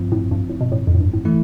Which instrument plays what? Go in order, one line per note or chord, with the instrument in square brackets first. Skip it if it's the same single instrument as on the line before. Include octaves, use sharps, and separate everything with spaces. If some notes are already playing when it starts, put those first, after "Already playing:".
Already playing: [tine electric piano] G2 F3 C4 F4
[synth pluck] A2
G2
A2
B2
A2
F2
A2
G2
A2
[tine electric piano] E3 A3 E4